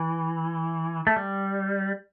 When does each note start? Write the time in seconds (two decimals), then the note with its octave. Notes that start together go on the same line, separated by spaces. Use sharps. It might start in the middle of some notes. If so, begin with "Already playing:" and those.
Already playing: E3
1.07 A3
1.16 G3